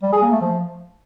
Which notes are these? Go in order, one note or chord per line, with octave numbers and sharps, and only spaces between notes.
G3
G#4
A#3
A3
F3